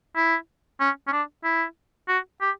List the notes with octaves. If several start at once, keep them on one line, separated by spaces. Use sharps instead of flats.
E4
C#4
C#4
D4
E4
F#4
G4